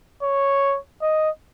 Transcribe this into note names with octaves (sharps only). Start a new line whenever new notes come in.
C#5
D#5